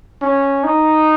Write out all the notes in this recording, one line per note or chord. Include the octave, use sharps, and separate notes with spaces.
C#4
D#4